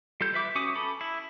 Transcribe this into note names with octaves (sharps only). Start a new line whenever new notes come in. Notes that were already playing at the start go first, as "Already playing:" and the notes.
G3 F4 A4 G6
B4 E5 D6
C#4 F#4 D6 D#6
A4 B5
E4